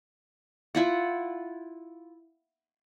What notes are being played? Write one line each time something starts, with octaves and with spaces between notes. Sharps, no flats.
E4 F4 F#5